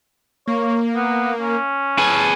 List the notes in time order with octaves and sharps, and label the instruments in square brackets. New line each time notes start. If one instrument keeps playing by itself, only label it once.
[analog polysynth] A#3 [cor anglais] C#5
[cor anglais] B3
C#4
[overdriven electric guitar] G#4 B4 [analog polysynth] A5